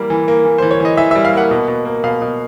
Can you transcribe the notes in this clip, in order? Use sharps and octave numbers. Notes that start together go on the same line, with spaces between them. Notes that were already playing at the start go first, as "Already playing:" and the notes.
Already playing: E3 G3 A#3
E3
A#3
E3
E3 C5
C#5
E3 D#5
E3 E5
E5
G3
F5
A#3 F#5
B2
B2
A#3
B2 F5
B2